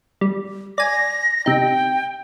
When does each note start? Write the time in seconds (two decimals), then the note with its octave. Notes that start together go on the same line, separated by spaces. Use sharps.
0.21 G3
0.78 D5 G#5 A#6
1.46 C3 D#4 G5